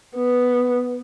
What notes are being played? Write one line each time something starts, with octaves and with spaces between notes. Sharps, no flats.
B3